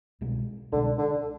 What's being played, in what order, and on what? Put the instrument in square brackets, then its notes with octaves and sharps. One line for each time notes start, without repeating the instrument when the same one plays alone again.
[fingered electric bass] C2 B2 G#3
[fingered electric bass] C2 B2 G#3 [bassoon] D3
[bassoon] D3